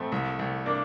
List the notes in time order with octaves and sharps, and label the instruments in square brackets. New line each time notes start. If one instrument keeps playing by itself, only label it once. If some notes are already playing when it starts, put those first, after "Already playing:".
Already playing: [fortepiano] F2 [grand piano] A3 C4
[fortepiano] C2
C2
[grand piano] A#3 D4